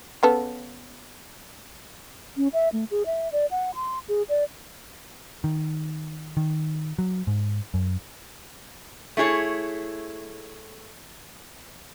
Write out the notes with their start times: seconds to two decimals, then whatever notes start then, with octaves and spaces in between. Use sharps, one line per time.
0.23 C#3 B3 A4
2.37 C#4
2.53 E5
2.73 A3
2.91 G#4
3.06 E5
3.32 D5
3.51 F#5
3.75 C6
4.08 G#4
4.29 D5
5.44 D#3
6.37 D#3
6.99 F#3
7.27 G#2
7.74 F#2
9.17 A3 E4 G#4 C#5